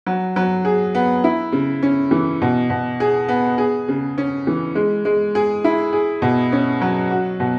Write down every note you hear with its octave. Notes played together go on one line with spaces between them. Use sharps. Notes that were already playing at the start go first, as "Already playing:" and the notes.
F#3
F#3
G#4
B3
E4
C#3
C#4
E3
B2
B2
G#4
B3
G#4
C#3
C#4
E3
G#3
G#3
G#4
E4
G#4
B2
C#4
F#3
F#4
B2